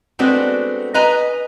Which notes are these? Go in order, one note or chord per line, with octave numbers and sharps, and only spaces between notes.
G#3 A3 B3 C4 D4 F#4
B4 D#5 G#5 A#5